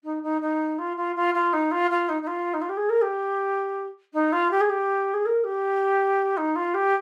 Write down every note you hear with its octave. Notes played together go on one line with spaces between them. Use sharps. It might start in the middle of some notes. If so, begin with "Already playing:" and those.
D#4
D#4
D#4
F4
F4
F4
F4
D#4
F4
F4
D#4
D#4
F4
D#4
F4
G4
G#4
A#4
G4
D#4
F4
G4
G#4
G4
G#4
A#4
G4
D#4
F4
G4